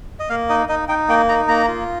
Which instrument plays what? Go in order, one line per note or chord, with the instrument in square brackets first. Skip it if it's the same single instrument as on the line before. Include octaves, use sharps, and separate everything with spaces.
[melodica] D#5
A#3 F5
D#4 D#5
D#4 D#5
D#4 G5
A#3 G5
D#4 A#5
A#3 A#5
F4